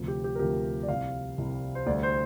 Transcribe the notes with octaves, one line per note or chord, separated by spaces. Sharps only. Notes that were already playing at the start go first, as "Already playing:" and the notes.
Already playing: D2 C3 F3
G4
G4
A#4
D2 C3 F3 G4
D5
C2 C3 G3 F5
C2 C3 G3
C5
D2 D3 G3 D5
C5